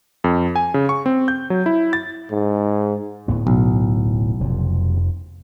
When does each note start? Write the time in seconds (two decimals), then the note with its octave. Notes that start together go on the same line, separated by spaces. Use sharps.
0.24 F2
0.56 G#5
0.74 C#3
0.89 C#6
1.06 C4
1.28 G6
1.50 F#3
1.66 E4
1.93 A6
2.30 G#2
3.28 D1 A2 B3
3.47 B1
4.40 F1 F2